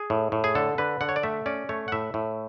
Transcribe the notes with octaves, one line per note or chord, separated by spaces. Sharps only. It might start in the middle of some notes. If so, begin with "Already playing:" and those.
Already playing: G#4
A2
A2
G#4
D3 A4
D3 B4
D3 F#5
C#5
D5
A3 E5
C#4 D5
A3 C#5
F#5
A2 E5
A2